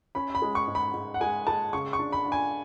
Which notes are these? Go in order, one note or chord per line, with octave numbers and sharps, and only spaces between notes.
C#4 B5
B5
G#3
C#6
G#2
B5
G#2
F#5
G#3 G#5
G#3 A5
C#3 C#6
C#6
D4
B5
D4
G#5